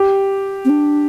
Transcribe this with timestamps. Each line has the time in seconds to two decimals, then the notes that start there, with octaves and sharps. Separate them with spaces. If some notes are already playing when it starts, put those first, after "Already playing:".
Already playing: G4
0.65 C4
0.70 D4